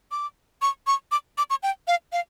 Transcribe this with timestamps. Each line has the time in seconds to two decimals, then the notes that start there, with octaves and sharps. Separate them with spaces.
0.11 D6
0.62 C#6
0.87 C#6
1.12 D6
1.38 D6
1.50 C#6
1.63 G5
1.88 F5
2.13 F5